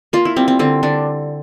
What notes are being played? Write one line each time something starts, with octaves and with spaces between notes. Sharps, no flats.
A#3 F4
E4
G3 C4
C4
D3 C4
D3 D4